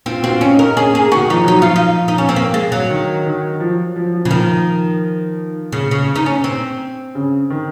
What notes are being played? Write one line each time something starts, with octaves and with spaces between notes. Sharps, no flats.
C4 F4
C4 F#4
F4
C#4
D#4
A#4
C#4 G#4
A#3 G#4
D#3 F#4
F3 D#4
F#3 D#4
F3 F4
D#4
D#4
C#4
C4
A#3
G#3
F#3
D#3
D#3
F3
F3
F3
C#3
D#3 F3
C#3
C#3
D#4
C#4
C4
C#3
D#3